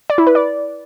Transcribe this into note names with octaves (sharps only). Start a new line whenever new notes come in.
D5
E4
B4
D5